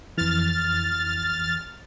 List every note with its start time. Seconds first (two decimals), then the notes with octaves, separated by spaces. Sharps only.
0.17 F2 E3 F6 A6